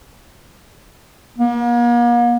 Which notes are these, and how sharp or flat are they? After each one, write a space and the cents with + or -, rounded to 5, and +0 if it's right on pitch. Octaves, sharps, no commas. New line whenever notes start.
A#3 +40